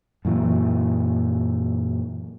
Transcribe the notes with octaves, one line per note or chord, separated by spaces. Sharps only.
F#2 A#2 E3